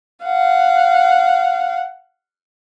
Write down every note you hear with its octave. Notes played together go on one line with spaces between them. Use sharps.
F5 F#5